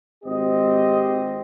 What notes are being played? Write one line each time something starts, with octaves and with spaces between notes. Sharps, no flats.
G#1 C4 G4 D#5